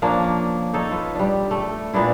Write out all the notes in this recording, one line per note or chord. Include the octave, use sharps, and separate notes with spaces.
F3 A#3 C#4 D4
D#4 A4 C#5
F4 B4
G3 D4
A3
A#2 B3 D4 E4